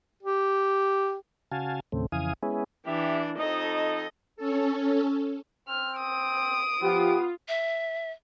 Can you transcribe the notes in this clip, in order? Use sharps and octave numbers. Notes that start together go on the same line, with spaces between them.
G4
C#3 F#4 F5 G#5 A5
D#2 A2 C#3 A3 C4
F2 C#3 E3 F5 G#5 D#6
G#3 B3 C#4 E4 G#4
E3 D4 G4 E5
F2 D#4 A4 D#5
C#4 A4
C4 F6
D#6 D7
F3 B3 F4 G4
E5